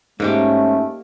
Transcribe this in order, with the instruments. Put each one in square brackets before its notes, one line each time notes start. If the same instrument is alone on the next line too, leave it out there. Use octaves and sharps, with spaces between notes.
[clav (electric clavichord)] G#2 [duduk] A3 [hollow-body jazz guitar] A#3 D#4 G4 [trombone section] C#4